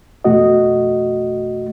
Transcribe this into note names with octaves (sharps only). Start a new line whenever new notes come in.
F2 B2 A3 F#4 D#5